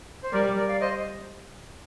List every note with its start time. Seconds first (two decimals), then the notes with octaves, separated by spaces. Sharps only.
0.23 C5
0.32 G3 A#4 D5
0.56 A#4 D5
0.68 D5 F5
0.81 C5 D#5